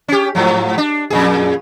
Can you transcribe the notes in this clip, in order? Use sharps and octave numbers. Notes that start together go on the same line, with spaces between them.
C#4 G4
G#2 F3 F#3
D4
F2 A#2 G#4